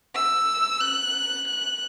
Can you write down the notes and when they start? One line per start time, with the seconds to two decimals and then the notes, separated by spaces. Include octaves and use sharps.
0.15 E6
0.81 F#6
1.48 F#6